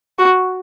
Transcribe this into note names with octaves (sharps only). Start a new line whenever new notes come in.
F#4